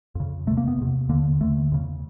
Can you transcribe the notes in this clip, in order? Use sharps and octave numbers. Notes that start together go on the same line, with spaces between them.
F2 C#3
E2 C3 A3
A#3
B3
E2 C3
D#2 D3 A#3
D#2 D3 A3
E2 C#3